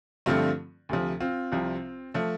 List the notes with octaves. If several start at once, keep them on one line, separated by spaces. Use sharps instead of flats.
G2 D3 F3 A3 C4 F4
D2 C3 F3
C4 F4
C2 C3 F3
F3 A3